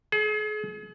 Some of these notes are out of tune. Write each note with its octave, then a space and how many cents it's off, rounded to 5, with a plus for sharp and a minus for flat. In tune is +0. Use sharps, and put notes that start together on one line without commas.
G#4 +40